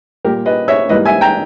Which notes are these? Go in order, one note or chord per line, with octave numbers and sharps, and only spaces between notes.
A#2 G3 A#3 G4 A#4
B4 D#5
C#5 E5
G#2 E3 G3 A#3 B4 D#5
E5 G#5
G5 A#5